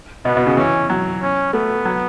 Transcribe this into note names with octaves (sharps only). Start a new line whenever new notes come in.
B2 B3
B2
C#3
E3 C#4
F#3
C#4
A3 B3
F#3